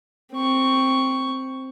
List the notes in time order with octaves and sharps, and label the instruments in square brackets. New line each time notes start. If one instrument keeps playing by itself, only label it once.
[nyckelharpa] C4 C#6